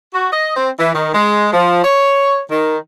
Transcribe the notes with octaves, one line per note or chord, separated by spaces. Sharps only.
F#4
D#5
C4
E3
D#3
G#3
F3
C#5
D#3